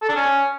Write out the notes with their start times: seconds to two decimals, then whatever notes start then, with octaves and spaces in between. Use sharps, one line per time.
0.02 A4
0.09 D4
0.16 C#4